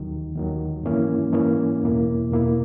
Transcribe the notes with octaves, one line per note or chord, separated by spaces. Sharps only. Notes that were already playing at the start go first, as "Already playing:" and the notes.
Already playing: D#2 D#3 F#3
D#2 D#3 F#3
G#2 E3 A#3 C#4 E4
G#2 E3 A#3 C#4 E4
E2 B2 A#3 E4
E2 B2 A#3 E4